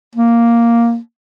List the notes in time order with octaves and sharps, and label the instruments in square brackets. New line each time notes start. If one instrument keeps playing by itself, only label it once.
[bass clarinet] A#3